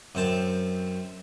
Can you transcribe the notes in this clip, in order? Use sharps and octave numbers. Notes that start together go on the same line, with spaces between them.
F#2 C4 A5